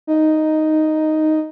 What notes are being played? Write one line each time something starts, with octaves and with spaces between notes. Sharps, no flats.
D#4